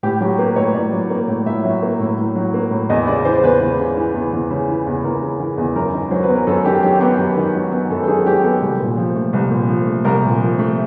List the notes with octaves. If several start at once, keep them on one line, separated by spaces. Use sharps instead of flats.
A2 G4
F#3 G4
A#3 B4
A2 C#5
A2 D5
F#3
A#3
A2
A2 E5
F#3
A#3
A2
A2
F#3
A#3
A2
E2 D#5
C#3 D5
E3 C5
E2 B4
E2
C#3
E3
E2
E2
C#3
E3
E2
E2 A#4
C#3
E3
E2
F#2 A#4
D#3
F#3 C5
B4
B3
A#4
F#2 A4
D#3 G4
F#3 G4
B3 G4
F#2
D#3
F#3
B3
F#2 A4
A4
D#3 G#4
F#3 G4
B3 A4
C2
A#2
F3
A3
C2
A#2
F3
A3
C2 A#4
A#2
F3
A3